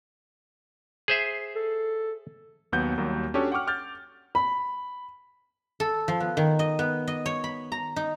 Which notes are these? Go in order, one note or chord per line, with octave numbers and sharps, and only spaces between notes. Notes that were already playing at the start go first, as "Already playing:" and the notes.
G#4 C5 E5
A4
D#2 F#3 B3 F#5 G6
D#2 F#3 G3 A#3
C#4 D4 F#4 G4 A4 C#5
F#5 G5 C#6 D6 F6
D6 F6 G6 A6
B5
A4
F3
B3
D#3
D#5
B3
D#5
C#5
B5
A#5
D#4